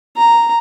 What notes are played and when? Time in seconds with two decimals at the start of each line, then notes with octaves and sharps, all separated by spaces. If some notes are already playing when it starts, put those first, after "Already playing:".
0.17 A#5